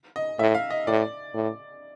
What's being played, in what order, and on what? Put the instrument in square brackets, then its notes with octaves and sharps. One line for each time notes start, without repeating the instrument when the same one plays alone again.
[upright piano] D#5
[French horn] A2 [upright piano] E5
[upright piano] F5
D#5
[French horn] A2 [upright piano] D5
[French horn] A2